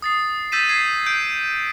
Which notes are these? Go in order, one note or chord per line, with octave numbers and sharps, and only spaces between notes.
D#6 A6 C7
E6 G6 A6 B6 D#7 E7
G#6 B6 C7
G6 D7